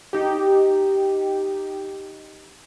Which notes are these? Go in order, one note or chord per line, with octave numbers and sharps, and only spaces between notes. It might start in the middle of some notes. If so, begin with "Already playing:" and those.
D#4 G4